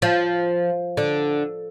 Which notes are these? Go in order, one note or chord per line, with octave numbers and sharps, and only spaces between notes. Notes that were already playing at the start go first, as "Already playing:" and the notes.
F3
D3